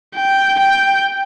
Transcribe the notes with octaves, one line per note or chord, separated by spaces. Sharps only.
G5
G5